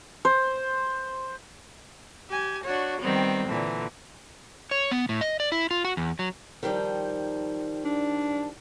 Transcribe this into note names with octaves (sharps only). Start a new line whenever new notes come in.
C5
G4 G#5
D4 F#4 C#5
D#3 G3 B3 C4
A#2 D3 E3
C#5
B3
A2
D#5
D5
E4
F4
F#4
E2
F#3
D#3 F3 G3
D4